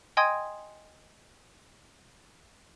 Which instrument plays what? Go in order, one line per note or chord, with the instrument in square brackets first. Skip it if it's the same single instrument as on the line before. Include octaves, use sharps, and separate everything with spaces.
[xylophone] D#5 G5 G#5 C6 D#6 G#6